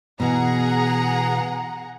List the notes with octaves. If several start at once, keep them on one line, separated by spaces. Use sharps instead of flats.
B2 E3 G#4 F#5 A#5